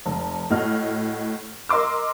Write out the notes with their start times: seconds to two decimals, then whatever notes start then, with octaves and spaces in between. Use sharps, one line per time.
0.06 F1
0.50 A2 F#4 D#5 F6
1.69 A#4 D#5 C6 D6 E6